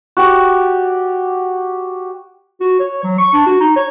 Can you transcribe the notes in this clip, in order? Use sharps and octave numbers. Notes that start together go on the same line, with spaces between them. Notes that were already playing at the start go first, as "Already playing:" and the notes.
F#4 G4 D5
F#4
C#5
F#3
C#6
D4
F#4
D#4
C#5